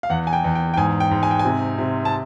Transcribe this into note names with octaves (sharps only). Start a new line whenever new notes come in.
F5
E2 F#5
G#5
G5
E2
G5
G5
G#2 G#5
G5
G#2
G#5
G5
G#5
C3
C3
A5